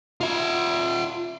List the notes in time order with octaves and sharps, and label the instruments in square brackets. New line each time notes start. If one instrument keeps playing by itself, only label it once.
[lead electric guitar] F4 E5